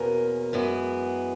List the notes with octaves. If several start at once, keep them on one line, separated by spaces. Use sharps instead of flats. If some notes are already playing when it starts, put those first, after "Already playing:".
Already playing: E2 B2 A#3 C#4 A#4
F#2 E3 G#3 B3